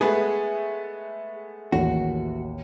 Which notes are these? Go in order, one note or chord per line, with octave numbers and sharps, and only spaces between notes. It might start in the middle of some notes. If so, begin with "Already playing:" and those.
G#3 A3 B3 G#4 B4
A1 D#2 F#4